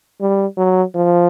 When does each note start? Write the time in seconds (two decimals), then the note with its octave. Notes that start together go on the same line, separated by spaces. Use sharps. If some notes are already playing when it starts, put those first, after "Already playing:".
0.21 G3
0.57 F#3
0.95 F3